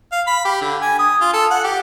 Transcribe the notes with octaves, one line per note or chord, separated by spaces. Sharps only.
F5
B5
G4
D3
G#5
D#6
F4
A4
F#5
G4